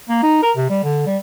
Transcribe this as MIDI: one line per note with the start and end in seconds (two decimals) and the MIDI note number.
0.09 0.19 58
0.23 0.38 63
0.43 0.51 70
0.57 0.68 48
0.70 0.80 55
0.84 1.04 50
1.07 1.18 55